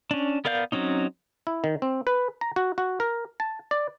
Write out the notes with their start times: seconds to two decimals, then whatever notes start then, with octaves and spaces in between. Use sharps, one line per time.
0.11 C#4 D4
0.45 B3 A#4 D5 F5 G6
0.72 F#3 C4 C#4 D#4
1.47 E4
1.64 D#3
1.82 C4
2.07 B4
2.41 A#5
2.56 F#4
2.78 F#4
3.00 A#4
3.40 A5
3.71 D5